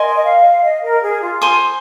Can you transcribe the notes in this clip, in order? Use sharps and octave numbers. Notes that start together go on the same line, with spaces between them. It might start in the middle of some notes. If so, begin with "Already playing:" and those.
Already playing: A#4 D#5 G#5 C6
F5
D#5
A#4
G#4
F4
C5 G#5 C6 D#6